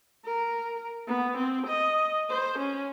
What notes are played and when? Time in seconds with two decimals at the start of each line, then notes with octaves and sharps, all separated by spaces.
0.25 A#4
1.07 B3
1.38 C4
1.67 D#5
2.29 C5
2.59 C#4